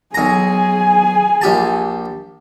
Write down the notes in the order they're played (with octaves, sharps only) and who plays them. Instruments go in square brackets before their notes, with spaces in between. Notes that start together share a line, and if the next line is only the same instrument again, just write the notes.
[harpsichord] B1 A#5 [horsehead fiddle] G#4 G#5
[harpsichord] A#1 G4 A5